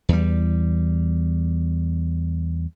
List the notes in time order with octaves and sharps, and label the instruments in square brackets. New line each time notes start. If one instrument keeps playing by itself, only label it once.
[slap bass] E2 G3